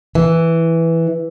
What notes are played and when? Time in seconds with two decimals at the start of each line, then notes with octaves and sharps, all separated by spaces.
0.15 E3